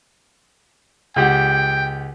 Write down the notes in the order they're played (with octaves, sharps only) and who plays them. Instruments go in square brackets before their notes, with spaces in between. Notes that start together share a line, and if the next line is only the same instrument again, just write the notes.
[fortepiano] C#2 G4 F#5 [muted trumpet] G5